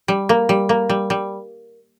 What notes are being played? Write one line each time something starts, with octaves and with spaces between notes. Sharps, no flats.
G3
A#3
G3
A#3
G3
G3